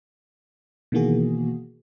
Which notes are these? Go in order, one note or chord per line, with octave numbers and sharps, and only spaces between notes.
B2 D#3 E3 A#3 F#4 G#4